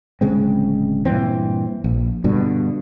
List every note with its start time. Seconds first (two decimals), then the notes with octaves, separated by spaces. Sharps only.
0.21 D1 C#3 G#3 C4
1.05 G2 A#2 E3 C4
1.84 A#1
2.24 G2 B2 D3